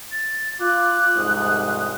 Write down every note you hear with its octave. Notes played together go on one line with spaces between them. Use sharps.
A6
F4 D6 F#6
C2 F2 G#2 D#6